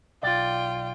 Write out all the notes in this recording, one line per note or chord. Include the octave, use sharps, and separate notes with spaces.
B1 F4 D5 G5